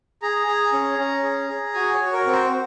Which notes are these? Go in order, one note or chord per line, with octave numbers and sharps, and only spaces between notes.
G#4 A#5
G#4
C#4
C#4
G#4
G#4
F#4 G#5
C#5
F#4
A#4
C4
C5